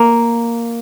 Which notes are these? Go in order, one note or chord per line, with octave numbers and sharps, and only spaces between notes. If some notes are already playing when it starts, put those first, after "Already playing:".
Already playing: A#3